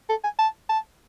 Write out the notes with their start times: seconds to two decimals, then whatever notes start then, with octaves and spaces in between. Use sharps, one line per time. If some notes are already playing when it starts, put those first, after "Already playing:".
0.10 A4
0.24 G#5
0.39 A5
0.69 A5